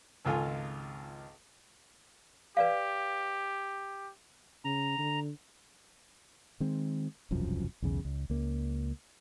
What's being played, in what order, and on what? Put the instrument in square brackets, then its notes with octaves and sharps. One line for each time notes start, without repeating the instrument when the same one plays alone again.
[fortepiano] G#1 C#2 F4 A4 G#5
[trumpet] G4 [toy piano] B4 D5 F5
[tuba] C#3 [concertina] A#5
[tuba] D3
[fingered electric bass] D#3 G#3 C4
E1 C2 F#2 F3
B1 E2 C#3
C#2
C#2 A#3